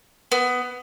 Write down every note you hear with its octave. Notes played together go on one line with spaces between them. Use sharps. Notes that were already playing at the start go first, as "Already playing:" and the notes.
B3